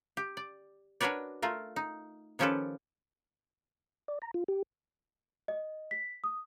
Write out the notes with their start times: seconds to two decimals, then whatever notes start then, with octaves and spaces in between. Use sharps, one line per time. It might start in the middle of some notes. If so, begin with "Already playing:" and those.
0.17 G4
0.37 D5
1.01 D4 F#4 A#4 B4 C#5 D5
1.42 A3 F4 A#4
1.76 D#4
2.39 D#3 F3 C#4 G4 A4 B4
4.08 D5
4.22 A#5
4.34 F4
4.48 G4
5.48 D#5
5.91 B6
6.24 D#6